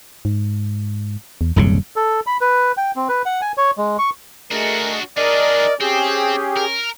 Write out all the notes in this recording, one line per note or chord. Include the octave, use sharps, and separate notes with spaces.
G#2
E2
D#1 C2 F#2 C#3
A4
B5
B4
G5
C4
B4
F#5
G#5
C#5
G#3
C#6
A3 D4 F#4 G#4 A#4 D#5
D4 G#4 A#4 D5 D#5
C4 C#4 G4 G#4
A#4